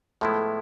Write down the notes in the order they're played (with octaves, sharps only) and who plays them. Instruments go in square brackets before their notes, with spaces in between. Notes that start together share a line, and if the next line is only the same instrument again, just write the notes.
[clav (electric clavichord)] A2 F3 G#3 B3 E4 [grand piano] A3